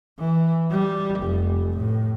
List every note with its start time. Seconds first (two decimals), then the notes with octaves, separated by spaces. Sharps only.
0.19 E3
0.71 G3
1.21 F1
1.78 A2